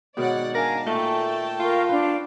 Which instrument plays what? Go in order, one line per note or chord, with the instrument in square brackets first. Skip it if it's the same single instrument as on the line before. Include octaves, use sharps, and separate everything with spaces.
[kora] G#2 B2 D#3 [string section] C#5 D5 F#5
[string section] D4 F5 [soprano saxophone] A#4 [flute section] G#5
[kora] A#2 [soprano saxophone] A3 [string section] A4 G5 A5 [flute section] C#6
[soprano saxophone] F4 [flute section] A#4 F5 C#6
[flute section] D4 F5 [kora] B4